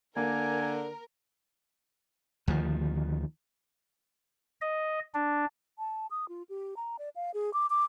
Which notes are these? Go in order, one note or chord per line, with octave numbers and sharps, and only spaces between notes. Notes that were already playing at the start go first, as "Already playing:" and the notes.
D3 A#3 A#4 G#5
D2 D#3 F3
D#5
D4
A5
D#6
F4
G4
A#5
D5
F5
G#4
D6
D6